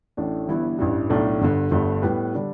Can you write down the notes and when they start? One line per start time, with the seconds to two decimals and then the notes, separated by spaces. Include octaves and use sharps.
0.17 A1 A2 A3 D4
0.48 G1 G2 E3 B3 E4
0.79 A1 G2 E3 G3
1.10 B1 A2 A3 D4
1.41 G1 G2 D3
1.71 G1 G2 D3 A3
2.02 A2 G3 B3 G4 B4
2.34 D3 G3 D4 A4